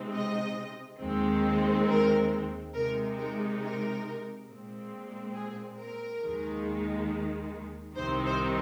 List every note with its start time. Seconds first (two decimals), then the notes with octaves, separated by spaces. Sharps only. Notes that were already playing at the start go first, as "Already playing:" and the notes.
Already playing: C3 G#3 C4 D#4
0.13 D#5
1.00 D#2 D#3 G#3 C4
1.87 A#4
2.74 C3 G#3 D#4 A#4
3.18 A#4
3.61 A#4
4.48 A#2 G#3 C4
5.35 G#4
5.79 A#4
6.22 D#2 D#3 G#3
7.97 C2 C3 D#3 C4 D#4 C5
8.26 C5